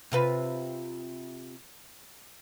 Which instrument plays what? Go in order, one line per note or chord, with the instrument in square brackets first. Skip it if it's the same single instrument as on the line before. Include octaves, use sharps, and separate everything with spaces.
[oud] C3 F4 B4